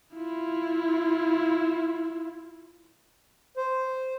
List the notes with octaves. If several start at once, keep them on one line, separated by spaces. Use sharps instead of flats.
E4 F4
C5